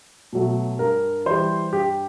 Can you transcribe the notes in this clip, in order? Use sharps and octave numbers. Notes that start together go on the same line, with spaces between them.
B2 F#3 A3
G2 A#4
E3 G3 C5
G2 G4